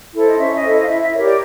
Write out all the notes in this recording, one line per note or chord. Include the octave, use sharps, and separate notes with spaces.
E4 A4 C5
D#5
C#4 E5
D#5
E4 A4 C5
D#5
F5
E4 E5
E5
G4 A#4 C#5
D5